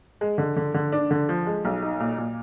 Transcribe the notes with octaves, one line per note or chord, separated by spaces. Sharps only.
G#3
D3
D3
D3
D4
D3
F3
G#3
B1
D#4
A#2
A#2